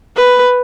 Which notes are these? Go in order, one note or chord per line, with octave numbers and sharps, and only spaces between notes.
B4